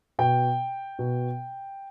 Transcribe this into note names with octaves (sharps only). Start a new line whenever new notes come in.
B2 G5
B2